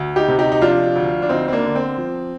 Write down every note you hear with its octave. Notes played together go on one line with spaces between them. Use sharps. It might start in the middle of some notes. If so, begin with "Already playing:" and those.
Already playing: D2
D#4 G4
C3
D#4 G4
D#4
F3 D4 F4
D2
D4
D2 C4 D#4
C4
A#3 D4
D3
C4
F3